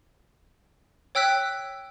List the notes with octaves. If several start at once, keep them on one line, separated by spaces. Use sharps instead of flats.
C#5 G5 E6 F#6 B6